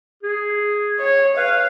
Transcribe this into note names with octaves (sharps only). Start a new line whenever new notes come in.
G#4
C#5
B4 F5